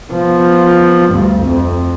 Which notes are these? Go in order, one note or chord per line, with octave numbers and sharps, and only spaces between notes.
F3 B3
D2 G2
F2